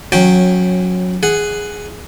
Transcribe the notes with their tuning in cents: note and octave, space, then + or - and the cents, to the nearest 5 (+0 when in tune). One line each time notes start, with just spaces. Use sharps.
F#3 -20 C#4 -10 G5 +0
G#4 +0 F#5 +5